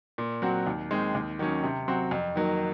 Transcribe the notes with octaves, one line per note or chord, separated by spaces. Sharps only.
A#2
F#3 C4 F#4
D#2
D#3 G#3 C4 D#4
D#2
D#3 F#3 C#4
C3
F#3 C4 F#4
F2
D#3 F#3 A#3